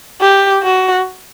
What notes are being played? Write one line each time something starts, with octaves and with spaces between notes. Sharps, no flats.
G4
F#4